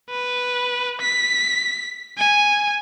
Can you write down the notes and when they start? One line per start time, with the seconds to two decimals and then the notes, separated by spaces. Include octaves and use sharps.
0.10 B4
1.01 B6
2.18 G#5